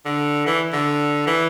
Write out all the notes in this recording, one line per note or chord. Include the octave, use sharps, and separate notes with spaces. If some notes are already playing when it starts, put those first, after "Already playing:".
D3
E3
D3
E3